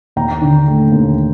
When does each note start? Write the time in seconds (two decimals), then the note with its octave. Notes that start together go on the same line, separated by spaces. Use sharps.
0.16 D#2 G5 A#5
0.42 D3
0.67 A3
0.92 D#2